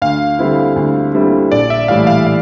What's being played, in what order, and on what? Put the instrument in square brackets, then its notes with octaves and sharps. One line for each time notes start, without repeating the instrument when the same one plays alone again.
[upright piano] D2 [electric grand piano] F5
[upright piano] D3 G3 C4 E4
D2
D3 G3 C4 E4
[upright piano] A#1 [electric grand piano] D5
[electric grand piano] E5
[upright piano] A2 E3 G3 [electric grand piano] F5
[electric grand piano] F5
F5